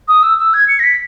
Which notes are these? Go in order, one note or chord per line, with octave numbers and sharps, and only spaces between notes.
D#6
E6
E6
G#6
C#7
A#6
B6